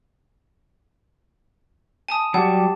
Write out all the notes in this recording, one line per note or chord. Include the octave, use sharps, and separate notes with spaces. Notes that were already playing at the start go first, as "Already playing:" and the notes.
G#5 A5 D#6
F#3 G3 G4 F#5 A5